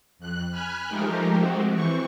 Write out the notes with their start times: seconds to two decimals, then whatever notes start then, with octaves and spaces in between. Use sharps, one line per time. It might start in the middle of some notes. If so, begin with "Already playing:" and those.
0.19 F2 F#6
0.49 G#5 B5 F6 F#6
0.88 F3 G#3 A3 D#4 G4 A#4
1.39 G#3 A3 C4 F#4 G4
1.73 E3 C4 C#6